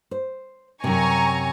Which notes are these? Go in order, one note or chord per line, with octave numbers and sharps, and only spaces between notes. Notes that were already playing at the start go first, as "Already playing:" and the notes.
C5
F#2 C3 G#5 A#5 C#6